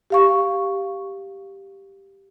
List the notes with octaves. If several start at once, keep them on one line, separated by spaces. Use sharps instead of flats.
G4 F5 C#6